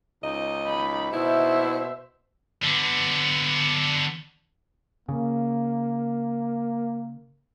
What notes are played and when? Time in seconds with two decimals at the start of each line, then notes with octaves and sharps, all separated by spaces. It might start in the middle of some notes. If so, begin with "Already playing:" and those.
0.23 C#2 D#4 D#5
0.66 B5
1.13 B2 E4 C5 E5
2.62 D3 B3
5.09 C#3 A#3